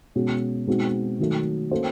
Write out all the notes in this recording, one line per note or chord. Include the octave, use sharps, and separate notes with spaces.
B2 G#3 C#4 F#4
B2 G#3 C4 D#4 F#4
D#3 F#3 A3
A#3 C#4 F#4 A4 C5